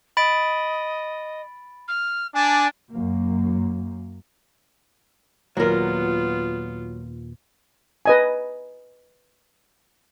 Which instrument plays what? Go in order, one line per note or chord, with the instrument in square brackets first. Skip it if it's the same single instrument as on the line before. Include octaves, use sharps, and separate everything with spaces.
[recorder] D#5 [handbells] B5 A6 D7
[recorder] F6
[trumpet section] D4 [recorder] G#5
[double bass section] F#2 A#3
[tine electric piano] D#2 A#2 [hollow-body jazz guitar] F#3 A#4 [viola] B3 F4
[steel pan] B4 D#5 G#5